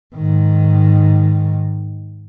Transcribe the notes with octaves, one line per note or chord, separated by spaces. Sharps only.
G#2 D#3